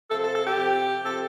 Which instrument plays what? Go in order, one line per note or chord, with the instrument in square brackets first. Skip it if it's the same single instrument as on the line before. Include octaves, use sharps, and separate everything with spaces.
[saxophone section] C3 F3 C4 A4
A4
A4
G4
C3 F3 C4
C3 F3 C4 A4